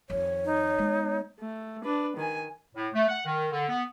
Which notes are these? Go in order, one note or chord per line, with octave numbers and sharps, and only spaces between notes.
F2 D#3 C#5
D#4
G#3 B3
A3
D4 B4
D#3 G#5
A2
A3
F#5
D#3
D3
B3